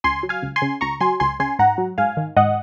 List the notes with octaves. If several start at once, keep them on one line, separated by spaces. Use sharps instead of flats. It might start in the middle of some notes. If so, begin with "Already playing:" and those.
C#2 G#5 C6
F#3
F5 G#5
C#2
G#5 C6
C#3
C#2 A#5 C#6
F#3 G#5 C6
C#2 G#5 C6
C#3 G#5 C6
G#2 F#5 A#5
F#3
G#2 F5 G#5
D#3
G#2 D#5 F#5